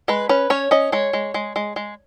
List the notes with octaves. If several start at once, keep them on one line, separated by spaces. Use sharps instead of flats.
G#3 B4
C#4 B4
C#4 C#5
C#4 D#5
G#3 C#5
G#3
G#3
G#3
G#3